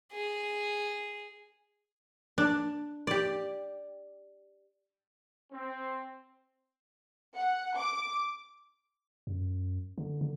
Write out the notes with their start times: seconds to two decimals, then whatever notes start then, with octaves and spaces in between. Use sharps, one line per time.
0.12 G#4
2.38 D4
3.07 G4 D5
5.52 C4
7.36 F#5
7.76 D6
9.27 F#2
9.98 D3
10.21 D3